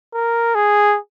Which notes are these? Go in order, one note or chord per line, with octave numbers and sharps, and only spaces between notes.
A#4
G#4